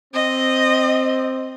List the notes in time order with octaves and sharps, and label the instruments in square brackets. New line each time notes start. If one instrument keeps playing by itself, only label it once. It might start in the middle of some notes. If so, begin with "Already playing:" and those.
[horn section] C4 [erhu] D#5